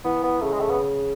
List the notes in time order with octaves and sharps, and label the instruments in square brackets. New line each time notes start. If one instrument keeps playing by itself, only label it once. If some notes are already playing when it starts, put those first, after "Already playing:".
[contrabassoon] E3 [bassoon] B3
[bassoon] B3
[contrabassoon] C#3 [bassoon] A3
[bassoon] G#3
A3
B3